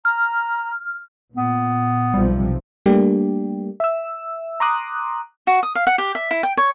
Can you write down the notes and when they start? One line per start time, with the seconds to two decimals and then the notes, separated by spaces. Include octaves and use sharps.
0.05 A#5 F6
1.36 A#2 B3
2.14 B1 C3 F3 G3
2.86 G3 A3 A#3 D4 G4
3.80 E5 E6
4.60 A#5 C6 D6 D#6 F#6
5.47 F#4
5.63 D#6
5.75 F5
5.87 F#5
5.98 G4
6.15 E5
6.31 E4
6.43 G5
6.57 C#5